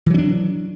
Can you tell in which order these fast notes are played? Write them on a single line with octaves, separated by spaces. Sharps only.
E3 F#3 C#4 D4